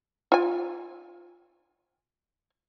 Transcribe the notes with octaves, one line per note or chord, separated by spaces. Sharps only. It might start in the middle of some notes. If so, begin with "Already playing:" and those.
F4 G#5